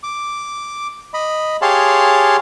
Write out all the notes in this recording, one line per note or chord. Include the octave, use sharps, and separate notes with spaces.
D6
D#5 B5
G4 G#4 C#5 F5 A5 C6